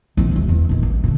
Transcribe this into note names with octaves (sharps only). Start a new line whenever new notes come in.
A#1 F3
D#1 A1
E2
A#2 D#3
A1
A#2 D3